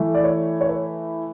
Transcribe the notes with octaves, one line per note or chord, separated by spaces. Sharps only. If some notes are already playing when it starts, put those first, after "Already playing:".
Already playing: E3 A3 E4
D5
C#5
C#5
B4